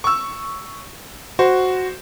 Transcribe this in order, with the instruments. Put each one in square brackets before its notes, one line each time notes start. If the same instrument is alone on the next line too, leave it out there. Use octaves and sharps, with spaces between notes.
[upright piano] C#6 E6
[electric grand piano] F#4 [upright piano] C5